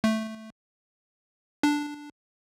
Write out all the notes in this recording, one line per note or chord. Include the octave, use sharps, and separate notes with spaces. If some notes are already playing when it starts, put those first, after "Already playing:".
A3
D4